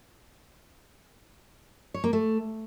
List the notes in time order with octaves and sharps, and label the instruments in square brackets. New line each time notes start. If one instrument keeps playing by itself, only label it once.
[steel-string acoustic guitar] C#5
A#3
A3